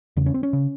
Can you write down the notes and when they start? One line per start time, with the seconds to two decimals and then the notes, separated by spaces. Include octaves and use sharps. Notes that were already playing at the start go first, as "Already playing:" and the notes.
0.17 E2 C#3
0.26 C#4
0.34 C4
0.43 C#4
0.53 C#3